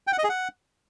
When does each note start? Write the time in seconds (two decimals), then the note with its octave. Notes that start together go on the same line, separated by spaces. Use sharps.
0.07 G5
0.13 F#5
0.18 D#5
0.24 G#4
0.29 F#5